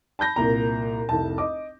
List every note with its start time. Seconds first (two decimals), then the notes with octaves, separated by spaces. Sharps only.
0.19 A5 B5 G6 A#6
0.36 C2 A#2 A#5
1.09 F1 C2 A5
1.38 D#5 D6